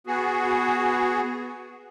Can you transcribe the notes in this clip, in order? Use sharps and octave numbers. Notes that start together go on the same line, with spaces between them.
B3 F#4 G#4